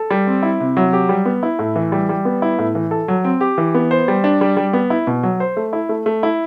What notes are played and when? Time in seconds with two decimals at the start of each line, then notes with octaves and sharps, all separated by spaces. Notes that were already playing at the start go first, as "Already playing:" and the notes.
Already playing: A4
0.10 G3
0.27 C4
0.43 E4
0.60 C3
0.77 F#3
0.93 G4
1.09 G3
1.25 B3
1.43 E4
1.59 A2
1.76 E3
1.92 G3
2.09 G3
2.25 B3
2.42 E4
2.59 A2
2.75 E3
2.91 A4
3.08 F#3
3.24 C4
3.41 G4
3.58 E3
3.74 B3
3.91 C5
4.08 G3
4.24 D4
4.41 G3
4.57 G3
4.73 B3
4.90 E4
5.07 B2
5.23 F#3
5.40 C5
5.57 A3
5.73 E4
5.89 A3
6.06 A3
6.23 E4